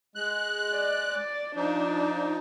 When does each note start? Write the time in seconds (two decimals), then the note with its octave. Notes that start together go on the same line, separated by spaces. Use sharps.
0.15 G#3 F#6
0.73 D5
1.13 D5
1.56 F3 D4 D#4